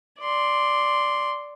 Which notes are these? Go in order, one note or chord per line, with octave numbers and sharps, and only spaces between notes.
D5 C6